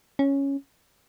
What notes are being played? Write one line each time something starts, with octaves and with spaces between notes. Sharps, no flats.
C#4